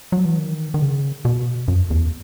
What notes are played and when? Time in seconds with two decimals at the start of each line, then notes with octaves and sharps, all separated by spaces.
0.12 F#3
0.25 E3
0.38 D#3
0.74 D#3
0.82 C#3
1.25 B2
1.68 F#2
1.90 E2